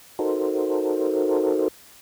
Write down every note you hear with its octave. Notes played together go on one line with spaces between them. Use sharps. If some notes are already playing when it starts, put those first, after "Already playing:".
D#4 F#4 A4 A#4 C5